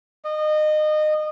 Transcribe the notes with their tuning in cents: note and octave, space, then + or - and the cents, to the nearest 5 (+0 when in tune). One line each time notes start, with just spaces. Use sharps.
D#5 -25